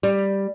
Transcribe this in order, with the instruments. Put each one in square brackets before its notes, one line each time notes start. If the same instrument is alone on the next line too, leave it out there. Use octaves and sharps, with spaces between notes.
[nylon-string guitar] G3